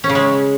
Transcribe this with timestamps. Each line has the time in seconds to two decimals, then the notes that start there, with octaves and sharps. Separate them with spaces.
0.04 C#4
0.09 C#3
0.15 G#3